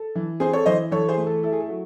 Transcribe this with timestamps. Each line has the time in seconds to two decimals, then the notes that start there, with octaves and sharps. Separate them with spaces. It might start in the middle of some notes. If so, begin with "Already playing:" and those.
Already playing: A4
0.15 E3
0.40 C4 G#4 C5
0.53 A4 C#5
0.66 E3 C5 D#5
0.91 E3 A4 C#5
1.09 G#4 C5
1.17 A3
1.26 A4
1.43 E4 A4
1.52 G#4
1.60 A4
1.69 F#3